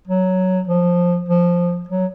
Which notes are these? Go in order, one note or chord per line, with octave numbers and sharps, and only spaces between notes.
F#3
F3
F3
F#3